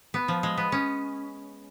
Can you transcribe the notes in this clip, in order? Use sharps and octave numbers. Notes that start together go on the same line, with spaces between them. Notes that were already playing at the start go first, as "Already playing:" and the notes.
B3
F3
G#3
B3
C#4